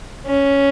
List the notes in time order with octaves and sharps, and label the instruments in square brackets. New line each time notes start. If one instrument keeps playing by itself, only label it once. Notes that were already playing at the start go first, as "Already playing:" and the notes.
[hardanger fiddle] C#4